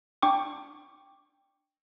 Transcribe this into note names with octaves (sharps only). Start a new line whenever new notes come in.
D4 G5 C#6 D6